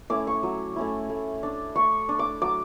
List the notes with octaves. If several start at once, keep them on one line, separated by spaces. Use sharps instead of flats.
A3 C#4 E4 D6
C#6
F#3
A3 C#4 E4
A3
D4
A3 C#6
D4
D6
F#3 D6